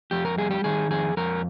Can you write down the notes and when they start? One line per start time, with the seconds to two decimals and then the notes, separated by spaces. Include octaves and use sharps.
0.11 F2 G4
0.25 A#4
0.38 G3 G#4
0.51 G4
0.64 D#3 G#4
0.91 F2 G#4
1.17 F2 A#4